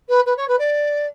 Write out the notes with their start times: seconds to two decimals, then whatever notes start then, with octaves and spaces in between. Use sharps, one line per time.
0.09 B4
0.26 B4
0.37 C#5
0.48 B4
0.59 D5